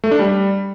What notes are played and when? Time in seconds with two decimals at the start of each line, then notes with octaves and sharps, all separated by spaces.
0.04 A3
0.11 D4
0.19 G3